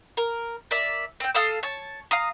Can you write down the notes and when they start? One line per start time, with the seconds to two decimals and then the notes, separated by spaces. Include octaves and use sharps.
0.17 A#4
0.71 A#4 D5 E5
1.20 C4 G5
1.35 A4 F5 D#6 E6
1.63 C#5 A5
2.11 F5 A#5 D#6